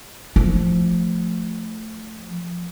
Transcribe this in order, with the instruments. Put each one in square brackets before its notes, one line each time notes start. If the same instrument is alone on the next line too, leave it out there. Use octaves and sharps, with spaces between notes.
[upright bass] F3 A3